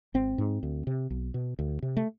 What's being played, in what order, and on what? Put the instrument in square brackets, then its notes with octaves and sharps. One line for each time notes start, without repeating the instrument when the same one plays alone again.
[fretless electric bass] G#1 C4
G#2
D2
C3
B1
B2
D2
C3
A3